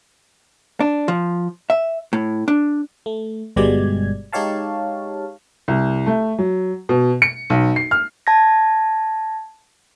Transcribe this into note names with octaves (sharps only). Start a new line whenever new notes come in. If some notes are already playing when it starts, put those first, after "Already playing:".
D4
F3
E5
A2
D4
A3
G1 B2 G3 G#3 D5 G#6
G#3 D#4 G4 C#5 F5 A5
C2
A3
F#3
B2
C#7
B1
C7
F6
A5 G#6 A#6